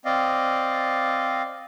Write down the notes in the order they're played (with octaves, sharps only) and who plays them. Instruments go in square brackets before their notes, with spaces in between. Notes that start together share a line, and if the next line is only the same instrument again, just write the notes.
[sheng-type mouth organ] C4 D5 D#5 F5